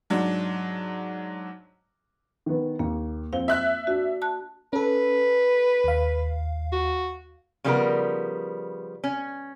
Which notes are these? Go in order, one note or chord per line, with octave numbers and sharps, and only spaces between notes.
G#2 F#3 D4
D#3 B3
D#2 A#3
F2 C4 F5 G7
E5 F#6
D4 F#4
A5 F#6
C#4 A4 B4
D#2 F5
F#4
C#3 F3 G3 B3 E4 A#4
C#4